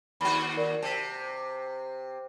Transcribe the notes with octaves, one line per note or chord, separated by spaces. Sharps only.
D#2 F#4 B5
A#4 D5
C3 A5 B6